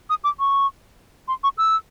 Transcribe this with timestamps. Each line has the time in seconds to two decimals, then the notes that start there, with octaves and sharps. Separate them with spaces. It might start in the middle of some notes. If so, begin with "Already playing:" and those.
0.10 D#6
0.24 D6
0.39 C#6
1.28 C6
1.43 C#6
1.58 E6